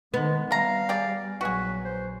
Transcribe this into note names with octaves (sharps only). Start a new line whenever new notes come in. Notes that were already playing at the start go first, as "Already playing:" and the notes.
D#3 G#3 B3
C3 G3 F5 A#5
G4 G#4 D5
A#1 F#3 F#4 G#4 B4
C5